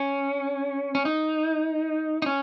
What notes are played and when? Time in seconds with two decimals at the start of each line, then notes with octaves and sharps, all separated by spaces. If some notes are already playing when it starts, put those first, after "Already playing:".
Already playing: C#4
0.95 C#4
1.05 D#4
2.22 D#4
2.26 C#4